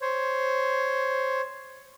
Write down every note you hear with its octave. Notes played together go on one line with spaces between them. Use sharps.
C5 C#5